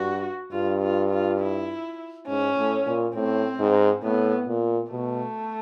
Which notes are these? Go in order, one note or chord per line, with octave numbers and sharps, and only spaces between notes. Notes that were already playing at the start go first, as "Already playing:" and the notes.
Already playing: G2 F#4
G2 F4
F4
F4
E4
G#2 C#4
A2
A#2
A2 C4
G#2
A2 B3
A#2
B2 A3